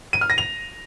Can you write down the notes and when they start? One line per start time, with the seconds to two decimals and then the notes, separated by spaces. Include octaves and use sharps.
0.13 D#7
0.21 F6
0.30 A#6
0.38 F7